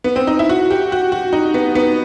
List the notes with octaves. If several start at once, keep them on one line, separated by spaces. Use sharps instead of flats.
B3
C4
D#4
E4
F#4
G4
F#4
F#4
D#4
B3
B3